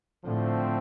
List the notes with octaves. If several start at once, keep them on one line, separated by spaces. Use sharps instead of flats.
A2 D3 F3 A3 C4